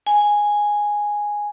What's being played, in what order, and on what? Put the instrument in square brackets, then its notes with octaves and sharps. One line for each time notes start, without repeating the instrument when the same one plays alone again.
[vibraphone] G#5